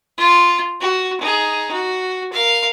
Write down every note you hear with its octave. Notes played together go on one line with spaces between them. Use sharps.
F4
F#4
D#4 G#4
F#4
A#4 F5